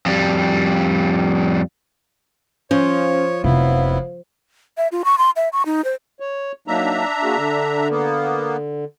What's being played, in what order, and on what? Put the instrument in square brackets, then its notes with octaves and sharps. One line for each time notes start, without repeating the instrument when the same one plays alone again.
[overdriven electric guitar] F2 G3
[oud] F3 [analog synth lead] C#4 [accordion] C#5
[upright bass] F1 [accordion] F#3 B3 E4 [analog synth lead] F5
[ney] E5
F4
C#6
C6
E5
C#6
D#4
C5
[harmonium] C#5
[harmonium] F#3 A#3 D#4 [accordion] D4 E5 A#5
[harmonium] A#3 F#4 G#4
D3
[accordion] A#3 B3